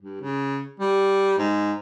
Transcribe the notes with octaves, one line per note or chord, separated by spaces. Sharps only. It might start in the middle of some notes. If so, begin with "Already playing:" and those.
G2
C#3
G3
G#2